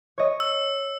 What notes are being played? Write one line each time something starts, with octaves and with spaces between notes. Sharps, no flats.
C#5 D#5
E6